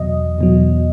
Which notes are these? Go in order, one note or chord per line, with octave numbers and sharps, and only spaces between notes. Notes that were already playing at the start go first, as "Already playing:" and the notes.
Already playing: E2 B2 F#3 D#5
E2 B2 F#3